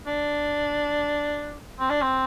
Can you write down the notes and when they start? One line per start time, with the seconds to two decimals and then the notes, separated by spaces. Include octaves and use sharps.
0.07 D4
1.79 C4
1.90 D4
2.02 C4